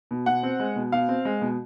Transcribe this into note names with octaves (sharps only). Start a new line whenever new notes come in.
B2
B2 F#5
C4
G#3
B2
B2 F5
C4
G#3
B2